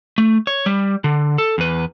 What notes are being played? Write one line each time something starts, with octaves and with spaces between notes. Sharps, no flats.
A3
C#5
G3
D3
A4
E2 B4